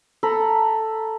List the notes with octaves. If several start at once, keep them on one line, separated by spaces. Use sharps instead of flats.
A4 A#5 B5